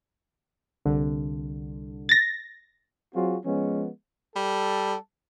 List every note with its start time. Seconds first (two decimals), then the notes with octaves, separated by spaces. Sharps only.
0.85 C2 D3
2.09 A6 A#6
3.14 F#3 C4 F4 F#4 G#4
3.44 F3 G#3 B3 C#4
4.36 G3 A4